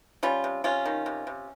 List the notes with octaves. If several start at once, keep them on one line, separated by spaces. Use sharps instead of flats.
G3 C#4 F4
C3
C3 C#4 F4
D#3
C3
C3